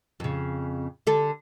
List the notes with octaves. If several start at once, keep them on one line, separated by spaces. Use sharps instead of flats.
F2 C#3
D3 A4